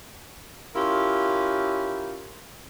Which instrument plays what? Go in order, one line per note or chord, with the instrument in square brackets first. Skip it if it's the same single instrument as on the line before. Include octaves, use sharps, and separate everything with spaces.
[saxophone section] C#4 E4 F4 G4 A#4